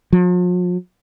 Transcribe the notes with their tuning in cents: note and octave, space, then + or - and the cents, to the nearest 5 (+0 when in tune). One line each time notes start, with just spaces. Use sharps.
F3 +45